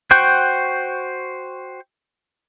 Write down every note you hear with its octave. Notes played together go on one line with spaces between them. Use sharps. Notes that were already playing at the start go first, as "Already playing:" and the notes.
F#4 C5 F#5 G5 C#6